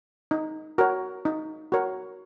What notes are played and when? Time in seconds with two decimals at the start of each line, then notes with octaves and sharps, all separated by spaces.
0.31 D#4
0.78 F#4 A#4 C#5
1.25 D#4
1.72 F#4 A#4 C#5